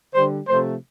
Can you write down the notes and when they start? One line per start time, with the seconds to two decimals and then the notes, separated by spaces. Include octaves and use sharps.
0.13 D3 G3 C5
0.47 C3 F3 A3 C5